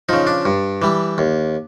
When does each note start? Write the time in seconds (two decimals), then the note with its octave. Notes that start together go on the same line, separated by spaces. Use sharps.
0.09 C#3 F3 D#4
0.27 D4
0.45 G2
0.82 E3 G3
1.18 D#2